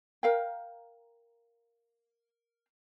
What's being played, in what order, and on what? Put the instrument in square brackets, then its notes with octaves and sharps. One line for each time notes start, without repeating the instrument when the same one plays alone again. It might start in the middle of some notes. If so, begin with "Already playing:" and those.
[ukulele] A#4 F5 G5